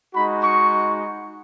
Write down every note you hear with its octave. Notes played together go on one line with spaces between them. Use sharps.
G#3 D#4 F#4 B5
C#6